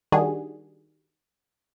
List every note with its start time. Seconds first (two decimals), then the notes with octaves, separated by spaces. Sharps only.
0.12 D#3 G3 D4 F#4 G#4